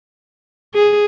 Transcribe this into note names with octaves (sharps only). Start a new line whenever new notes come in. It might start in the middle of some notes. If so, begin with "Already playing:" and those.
G#4